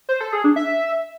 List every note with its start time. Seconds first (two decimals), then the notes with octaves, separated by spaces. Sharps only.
0.09 C5
0.20 A4
0.32 G#4
0.44 D4
0.56 E5